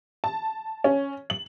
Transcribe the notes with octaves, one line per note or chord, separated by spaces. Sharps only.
A5
C#4
F#7